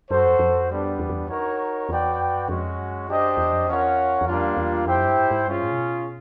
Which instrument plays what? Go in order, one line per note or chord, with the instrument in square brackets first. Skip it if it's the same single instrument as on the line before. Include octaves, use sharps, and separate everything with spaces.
[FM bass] F#2 [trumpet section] F#4 A4 C5
[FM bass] F2
F2
[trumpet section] G3 B3 D4
[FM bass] E2
F2
E2
[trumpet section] D#4 F#4 A#4 C#5
[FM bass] E2 [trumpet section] F#4 B4 D5 G5
[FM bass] F2
F#2
[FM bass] F2 [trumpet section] G#3 C#4 F#4
[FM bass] F#2
[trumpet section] D4 G4 C5 D#5
[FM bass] E2
F2
[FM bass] E2 [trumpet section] C#4 F4 A#4 C#5 F#5
[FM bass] E2
[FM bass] F2 [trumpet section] G3 A#3 D4 F4
[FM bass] E2
E2
[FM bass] F2 [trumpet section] E4 G4 C5 E5 G5
[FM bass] F#2
G2
G#2
G#2
[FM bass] G2 [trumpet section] C#4 F4 G#4
[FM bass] A2
C3
B2